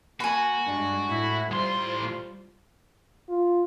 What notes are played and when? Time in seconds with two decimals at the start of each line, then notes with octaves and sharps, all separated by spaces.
0.20 A#3 F#4 G#5 B5
0.66 G2 G#3 D4
1.06 A2 E4
1.52 A2 G3 F4 C5 C6
3.29 F4